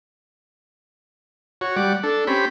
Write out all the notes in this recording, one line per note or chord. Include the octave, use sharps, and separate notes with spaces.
F#4 C#5
G3 D5 F#5
D4 A4
C4 C#4 G4 B5